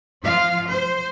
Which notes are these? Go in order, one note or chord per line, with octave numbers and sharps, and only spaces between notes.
F3 F4 F5
C5